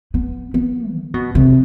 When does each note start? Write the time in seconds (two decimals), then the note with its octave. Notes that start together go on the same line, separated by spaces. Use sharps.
0.14 B3
0.54 B3
0.94 D3
1.14 B2
1.35 C3